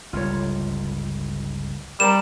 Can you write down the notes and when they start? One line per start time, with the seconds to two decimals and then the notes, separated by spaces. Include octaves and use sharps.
0.13 G1 C#2 G3 F4 C#5
2.00 G3 A#4 C5 A#5 E7